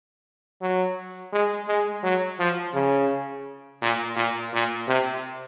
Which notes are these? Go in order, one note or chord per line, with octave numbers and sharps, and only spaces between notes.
F#3
G#3
G#3
F#3
F3
C#3
A#2
A#2
A#2
C3